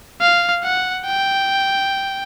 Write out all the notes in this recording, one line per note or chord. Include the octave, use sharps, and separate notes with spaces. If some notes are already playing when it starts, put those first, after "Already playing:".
F5
F#5
G5